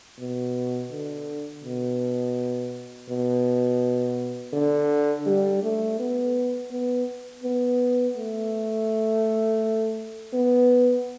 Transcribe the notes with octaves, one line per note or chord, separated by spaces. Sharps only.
B2
D3
B2
B2
D3
G3
A3
B3
B3
B3
A3
B3